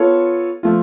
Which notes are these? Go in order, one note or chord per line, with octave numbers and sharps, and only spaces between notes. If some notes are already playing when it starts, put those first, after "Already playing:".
Already playing: B3 F4 A4 C#5
F3 A3 F4